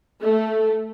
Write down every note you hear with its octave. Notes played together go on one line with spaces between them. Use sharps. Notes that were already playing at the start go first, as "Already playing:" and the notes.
A3